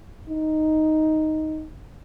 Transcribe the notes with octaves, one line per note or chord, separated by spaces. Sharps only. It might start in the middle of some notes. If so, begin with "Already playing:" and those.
D#4